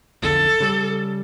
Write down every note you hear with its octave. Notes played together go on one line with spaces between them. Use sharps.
B1 F2 D3 A4
C#3 G3